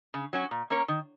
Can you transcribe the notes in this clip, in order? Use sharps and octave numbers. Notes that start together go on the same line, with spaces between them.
C#3
F#3 C#4 F#4
A#2
A#3 C#4 A#4 C#5
D#3